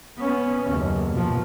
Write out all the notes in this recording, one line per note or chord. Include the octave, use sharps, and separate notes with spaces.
B3 C#4
F#1 D#2
B2 F3